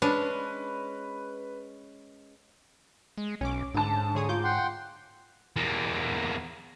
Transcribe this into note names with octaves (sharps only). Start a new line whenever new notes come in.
G#3 C#4 D4 B4
G#3
B1 C#4 D6
G#2 D3 A5
D2 G#4 C#5 D#6
F4 D6 G6
F#5 G5 C6
E2 A#3